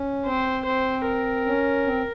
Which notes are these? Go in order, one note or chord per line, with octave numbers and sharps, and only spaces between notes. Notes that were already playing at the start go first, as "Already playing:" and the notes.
Already playing: C#4
C4 C5
C4 C5
A#4
C#4
C4